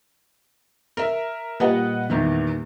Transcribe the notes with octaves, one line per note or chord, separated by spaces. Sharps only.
A#4 E5
A#2 G3 A#3 B4 D#5 F#5
E2 D#3 E3